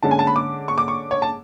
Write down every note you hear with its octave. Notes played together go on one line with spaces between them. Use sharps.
D3 G#3 C#4 A5
G#5
A5
B5
D6
C#6
D6
C#6
C#5
A5